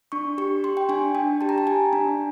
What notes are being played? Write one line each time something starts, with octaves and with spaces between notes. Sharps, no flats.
D4 C#6
G4 C#6
G4 C6
G5
D4 G#5
D4 G5
G4 A5
A#5
A5
G4 G#5
D4